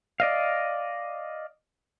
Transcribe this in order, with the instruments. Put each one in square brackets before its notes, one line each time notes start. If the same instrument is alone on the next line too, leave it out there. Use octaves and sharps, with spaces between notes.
[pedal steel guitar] D5 D#5 F5